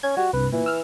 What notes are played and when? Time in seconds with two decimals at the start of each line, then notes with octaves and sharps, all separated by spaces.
0.03 C#4 G#6
0.17 G3 F#4
0.33 C2 G2 B4
0.52 A#2 E3
0.66 E6 F6